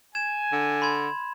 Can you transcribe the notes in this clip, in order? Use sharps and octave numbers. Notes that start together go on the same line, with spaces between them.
G#5 G#6 E7
D3
B5 C6 G#6